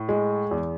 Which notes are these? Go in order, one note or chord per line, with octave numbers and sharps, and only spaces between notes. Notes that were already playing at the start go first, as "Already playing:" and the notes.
Already playing: A2
G#3
E2